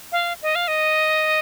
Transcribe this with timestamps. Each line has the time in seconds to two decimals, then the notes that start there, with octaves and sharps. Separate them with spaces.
0.12 F5
0.42 D#5
0.55 F5
0.68 D#5